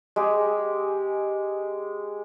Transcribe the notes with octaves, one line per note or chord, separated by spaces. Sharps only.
G#3 G4